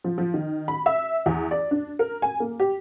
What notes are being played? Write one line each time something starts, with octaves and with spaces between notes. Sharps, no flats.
F3
F3
D#3
B5
E5
E2
D5
D4
A#4
G#5
A#3
G4